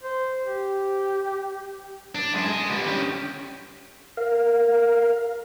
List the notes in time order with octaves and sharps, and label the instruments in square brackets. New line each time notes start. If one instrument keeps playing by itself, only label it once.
[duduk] C5
G4
[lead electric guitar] D4
F#2 G#3
G#4 D#5
D3 G3
C#4 G4
[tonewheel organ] A#4 F5